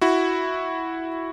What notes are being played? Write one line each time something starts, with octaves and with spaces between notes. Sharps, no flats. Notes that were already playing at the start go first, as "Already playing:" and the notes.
E4 F#4